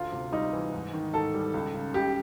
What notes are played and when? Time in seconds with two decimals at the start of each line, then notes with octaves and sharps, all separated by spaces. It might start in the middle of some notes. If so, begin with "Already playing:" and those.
Already playing: D2 F4
0.12 C3
0.32 G3 D#4
0.53 E3
0.72 G#2
0.93 D#3
1.14 G#2 A4
1.34 G3
1.54 C#2
1.74 C#3
1.94 C#2 G4